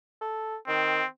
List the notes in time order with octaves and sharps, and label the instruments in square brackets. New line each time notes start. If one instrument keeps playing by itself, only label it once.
[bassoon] A4
[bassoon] D#3 [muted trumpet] C4